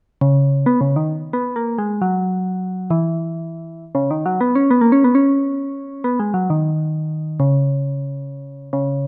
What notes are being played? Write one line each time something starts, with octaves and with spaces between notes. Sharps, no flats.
C#3
B3
C#3
D#3
B3
A#3
G#3
F#3
E3
C#3
D#3
F#3
B3
C#4
B3
A#3
C#4
B3
C#4
B3
G#3
F#3
D#3
C#3
C#3